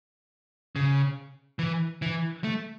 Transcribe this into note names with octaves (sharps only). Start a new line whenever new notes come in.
C#3
E3
E3
A3